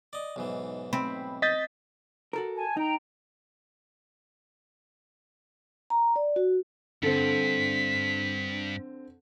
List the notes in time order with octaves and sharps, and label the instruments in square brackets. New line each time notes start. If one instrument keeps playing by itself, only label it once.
[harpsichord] D5 D#5
B1 G#2 E3
[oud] C4 [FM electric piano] B5
[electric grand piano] D#5 [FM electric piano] G6 A6 B6
[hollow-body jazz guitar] F#4 A4 A#4
[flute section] G#5 A5
[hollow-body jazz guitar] D#4 [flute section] G5 A#5
[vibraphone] A#5
D5
F#4
[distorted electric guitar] G2 [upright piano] D3 C4 [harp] A4 [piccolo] B6